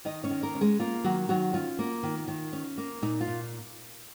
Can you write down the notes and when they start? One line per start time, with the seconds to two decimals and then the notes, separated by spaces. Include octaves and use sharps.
0.05 D#3 D#4 D#5
0.24 C#4 C#5
0.30 D#3
0.43 A#3 A#4
0.55 C#4
0.61 G#3 G#4
0.80 A#3 F4
1.04 D#3 F#3 F#4
1.29 D#3 F#3 F#4
1.54 C#4 F4
1.79 A#3
2.03 D#3
2.28 D#3
2.53 C#4
2.78 A#3
3.02 A#2 D#4
3.21 F4
3.27 A#2